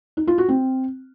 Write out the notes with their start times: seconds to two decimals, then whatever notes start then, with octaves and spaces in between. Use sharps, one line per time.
0.17 D#4
0.28 F4
0.38 F#4
0.49 C4